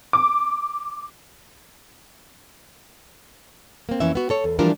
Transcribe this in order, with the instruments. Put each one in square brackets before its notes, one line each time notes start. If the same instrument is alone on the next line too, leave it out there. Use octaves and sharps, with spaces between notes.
[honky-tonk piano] D6
[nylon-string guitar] A#3 C4
F2 E3 A#3 C#4 E5
B3 F#4
A4 C#5
E2
E3 F3 G3 D4 F4 A#4